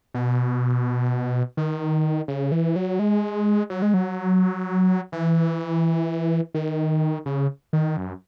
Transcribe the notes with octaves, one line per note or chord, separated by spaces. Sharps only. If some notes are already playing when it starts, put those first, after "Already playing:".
B2
D#3
C#3
E3
F#3
G#3
F#3
G#3
F#3
E3
D#3
C#3
D#3
F#2